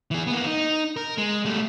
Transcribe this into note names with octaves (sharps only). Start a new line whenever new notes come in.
E3 G#4
A#3 B3
D#4
A#4
G#3
G3 A3